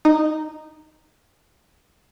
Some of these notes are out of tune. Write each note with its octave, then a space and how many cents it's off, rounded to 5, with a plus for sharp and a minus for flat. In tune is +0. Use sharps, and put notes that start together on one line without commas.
D#4 -10